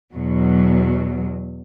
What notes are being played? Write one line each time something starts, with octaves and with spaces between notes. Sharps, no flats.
E2 B2 F#3